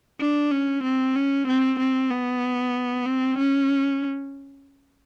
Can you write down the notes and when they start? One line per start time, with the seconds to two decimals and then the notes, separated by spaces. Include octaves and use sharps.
0.20 D4
0.51 C#4
0.83 C4
1.16 C#4
1.48 C4
1.79 C4
2.11 B3
3.06 C4
3.39 C#4